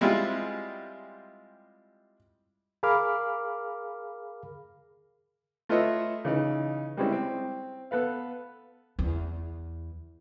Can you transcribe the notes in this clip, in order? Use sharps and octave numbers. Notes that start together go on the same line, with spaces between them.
G3 G#3 C4 E4 F4
G#4 A#4 F5 B5 D6 F6
A3 F4 B4 C#5 D#5 E5
C#3 E3 D#4
G3 G#3 C4 C#4 E4
C4
B3 A4 B4 F5
E2